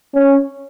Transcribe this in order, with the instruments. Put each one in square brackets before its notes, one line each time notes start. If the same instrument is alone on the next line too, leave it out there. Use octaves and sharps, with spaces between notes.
[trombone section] C#4